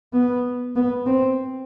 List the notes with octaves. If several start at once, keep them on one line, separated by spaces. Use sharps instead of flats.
B3
B3
C4